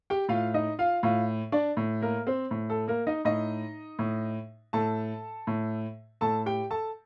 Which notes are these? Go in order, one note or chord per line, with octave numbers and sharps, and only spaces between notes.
G4 G5
A2 F4 F5
D#4 D#5
F4 F5
A2 F4 F5
D4 D5
A2
A#3 A#4
C4 C5
A2
A4
A#3 A#4
D#4 D#5
A2 D#4 D#5
A2
A2 A4 A5
A2
A2 A4 A5
G4 G5
A4 A5